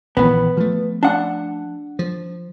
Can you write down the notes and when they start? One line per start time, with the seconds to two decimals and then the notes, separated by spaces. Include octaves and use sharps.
0.17 A#1 D#3 E3 B3
0.57 F3 A3
1.03 D4 F#5
1.99 F3